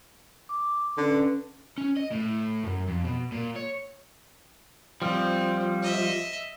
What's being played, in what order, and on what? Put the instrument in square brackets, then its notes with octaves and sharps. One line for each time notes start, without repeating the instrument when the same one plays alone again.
[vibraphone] D6
[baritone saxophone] D3 [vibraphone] C#4 B4
[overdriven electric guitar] C#4
D#5
A2
F#2
F2
B2
A#2
C#5
[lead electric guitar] F3 G3 [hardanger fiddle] C4
[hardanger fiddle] D#5 E5